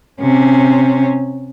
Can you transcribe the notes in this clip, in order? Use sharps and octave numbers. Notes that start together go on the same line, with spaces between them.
C3 C#4